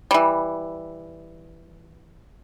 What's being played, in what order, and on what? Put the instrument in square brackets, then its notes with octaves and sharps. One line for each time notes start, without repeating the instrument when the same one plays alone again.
[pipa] E3 G3